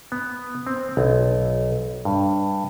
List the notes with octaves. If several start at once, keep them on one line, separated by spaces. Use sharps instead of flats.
B3
C4
B1
G2